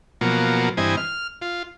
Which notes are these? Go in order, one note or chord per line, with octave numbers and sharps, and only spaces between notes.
B2 F3 F#3 A#3
G2 E3 C4 D#5 G#5
F6
F4